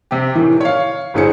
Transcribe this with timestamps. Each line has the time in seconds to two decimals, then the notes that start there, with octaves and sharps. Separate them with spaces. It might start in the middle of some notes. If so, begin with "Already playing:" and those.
0.11 C3 G4
0.35 A2 D#3 E3
0.61 C#5 F5
1.14 G1 A2 D3 G#4 C5 C#7